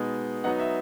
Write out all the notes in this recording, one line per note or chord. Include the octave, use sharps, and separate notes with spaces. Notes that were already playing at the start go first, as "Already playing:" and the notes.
Already playing: B2 G#3 B3 D#4
F#3 B3 D#4 F#5
E5